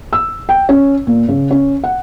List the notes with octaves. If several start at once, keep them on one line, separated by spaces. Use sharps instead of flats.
E6
G5
C#4
A#2
C#3
C#4
F#5